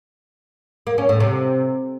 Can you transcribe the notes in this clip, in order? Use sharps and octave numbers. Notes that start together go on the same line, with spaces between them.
A#3
C#4
A2
C3